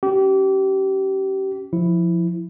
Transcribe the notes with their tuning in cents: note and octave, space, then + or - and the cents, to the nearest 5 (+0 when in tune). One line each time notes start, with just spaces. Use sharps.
C#4 +0 G4 -30
F3 +0 E4 +0